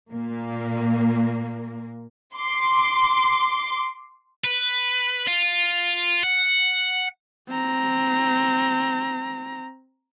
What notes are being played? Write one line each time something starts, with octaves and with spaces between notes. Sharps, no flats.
A#2 A#3
C6 D6
B4
F4
F#5
C4 A#5